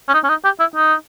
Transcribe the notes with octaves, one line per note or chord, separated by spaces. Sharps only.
C#4
D#4
C#4
D#4
G4
E4
D#4